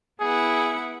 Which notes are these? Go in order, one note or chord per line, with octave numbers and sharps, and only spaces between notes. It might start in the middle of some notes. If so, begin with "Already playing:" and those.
B3 E4 G#4 F#5